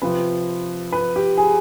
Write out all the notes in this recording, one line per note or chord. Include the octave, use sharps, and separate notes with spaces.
C3 F3 C4 B4
B4
G4
G#4